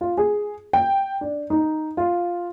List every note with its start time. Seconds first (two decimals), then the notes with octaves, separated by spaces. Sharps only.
0.01 F4
0.18 G#4
0.73 G5
1.21 D4
1.50 D#4
1.97 F4